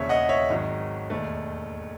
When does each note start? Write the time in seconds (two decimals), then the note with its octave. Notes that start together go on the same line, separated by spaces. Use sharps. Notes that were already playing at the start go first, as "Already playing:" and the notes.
Already playing: E1 D#2 C#3 C#5 E5
0.09 D#5 F#5
0.29 C#5 E5
0.50 G#1 G#2 D#3 F#3
1.10 E1 D#2 D#3 A3